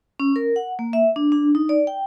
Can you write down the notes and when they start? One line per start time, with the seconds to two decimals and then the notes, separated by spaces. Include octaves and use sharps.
0.20 C#4
0.36 A#4
0.56 F#5
0.79 A#3
0.93 E5
1.16 D4
1.32 D4
1.55 D#4
1.69 D5
1.87 G5